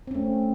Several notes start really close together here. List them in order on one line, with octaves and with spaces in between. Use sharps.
C4 C#4 A3